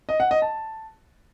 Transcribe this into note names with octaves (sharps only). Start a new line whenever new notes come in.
D#5
F#5
D#5
A5